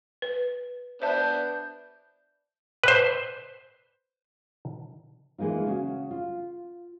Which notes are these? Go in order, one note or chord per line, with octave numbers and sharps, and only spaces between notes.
B4
B3 D4 C5 E5 A5 G6
B4 C5
E3 G#3 A#3 D#4 F4
C#3 C#4 F#4
F4